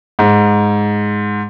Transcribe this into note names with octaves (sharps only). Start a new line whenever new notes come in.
G#2